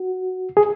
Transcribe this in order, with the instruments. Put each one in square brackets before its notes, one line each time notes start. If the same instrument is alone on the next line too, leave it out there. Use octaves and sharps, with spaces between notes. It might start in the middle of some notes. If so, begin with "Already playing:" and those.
Already playing: [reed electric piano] F#4
G#4